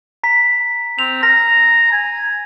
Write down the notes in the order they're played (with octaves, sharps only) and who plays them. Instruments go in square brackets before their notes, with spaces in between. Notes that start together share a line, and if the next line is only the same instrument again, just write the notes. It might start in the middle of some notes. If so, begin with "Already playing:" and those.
[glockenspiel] A#5 B6
[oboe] C4 [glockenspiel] F7
[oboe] A#5 [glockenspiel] A#6
[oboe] G#5